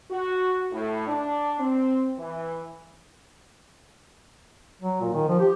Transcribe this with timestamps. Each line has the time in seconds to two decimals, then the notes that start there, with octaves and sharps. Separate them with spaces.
0.10 F#4
0.72 A2
1.08 D4
1.59 C4
2.18 E3
4.82 F#3
5.01 A#2
5.13 D#3
5.28 F3
5.39 G4